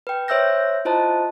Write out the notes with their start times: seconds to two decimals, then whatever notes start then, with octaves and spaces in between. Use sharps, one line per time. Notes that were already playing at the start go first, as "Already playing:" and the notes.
0.07 B4 G5
0.28 C5 C#5 E5 E6 G6 A#6
0.85 E4 F4 C5 D#5 A5